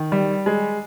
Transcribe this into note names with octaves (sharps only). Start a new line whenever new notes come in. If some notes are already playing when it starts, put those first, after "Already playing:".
Already playing: D#3
G3
G#3